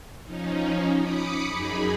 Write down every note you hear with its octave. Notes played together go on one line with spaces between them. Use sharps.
F3 C#4 D#4
B5 D6 D#6 C#7
F#2 D#4 G#4 B5